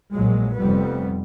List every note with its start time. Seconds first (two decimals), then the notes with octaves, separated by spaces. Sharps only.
0.12 A#1 A#2 F#3 G#3
0.57 F1 F2 G3 B3